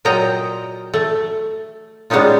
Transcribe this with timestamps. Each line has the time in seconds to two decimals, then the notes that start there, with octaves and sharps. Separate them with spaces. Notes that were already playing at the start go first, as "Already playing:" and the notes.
0.05 A#2 F#3 F4 D#5 G5 A#5
0.94 A3
2.10 G3 G#3 B3 C#4 D#4 F4